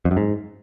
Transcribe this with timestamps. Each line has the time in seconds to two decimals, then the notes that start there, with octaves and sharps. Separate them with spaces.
0.05 F2
0.11 F#2
0.17 G#2